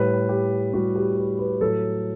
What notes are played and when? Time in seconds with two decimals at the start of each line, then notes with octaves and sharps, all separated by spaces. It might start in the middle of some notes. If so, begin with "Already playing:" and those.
Already playing: A2 G3 B4
0.29 G4
0.73 A2 G3 F#4
0.95 G4
1.17 B4
1.39 B4
1.61 A2 F#3 A4